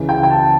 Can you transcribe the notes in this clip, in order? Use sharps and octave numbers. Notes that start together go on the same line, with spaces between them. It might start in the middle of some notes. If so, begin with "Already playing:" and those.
Already playing: C#2 C#3 E3
G5
G5
A5